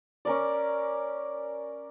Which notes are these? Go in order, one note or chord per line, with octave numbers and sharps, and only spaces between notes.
C#4 A#4 D5